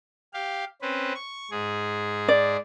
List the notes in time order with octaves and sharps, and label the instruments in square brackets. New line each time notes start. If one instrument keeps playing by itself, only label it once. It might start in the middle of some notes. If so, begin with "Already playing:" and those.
[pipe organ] G4 F5
C4 C#4 B4
C#6
G#2 G#4
[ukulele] D5